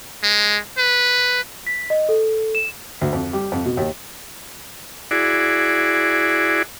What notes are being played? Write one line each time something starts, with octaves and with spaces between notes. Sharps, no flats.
G#3
B4
B6
D#5
A4
E7
D2
F2
G3
F2
B2
D#2
E4 F#4 G#4 D5